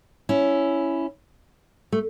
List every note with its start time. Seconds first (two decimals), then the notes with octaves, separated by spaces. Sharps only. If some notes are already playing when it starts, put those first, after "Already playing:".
0.29 C#4 E4
1.92 A3